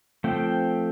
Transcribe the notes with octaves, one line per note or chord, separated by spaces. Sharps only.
F3 A3 C4 G5